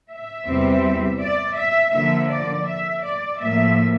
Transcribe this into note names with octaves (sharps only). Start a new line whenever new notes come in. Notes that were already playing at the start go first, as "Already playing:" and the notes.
E5
E2 C3 G3 C4
D5
E5
D3 F3 A#3 E5
D5
E5
D5
A2 F3 A#3 E5